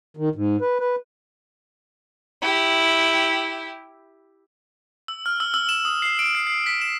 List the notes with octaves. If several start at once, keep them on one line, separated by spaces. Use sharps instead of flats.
D#3
G#2
B4
B4
E4 G4
E6
F6
E6
E6
E7
D#6
C7
D7
C7
C7
B6
E7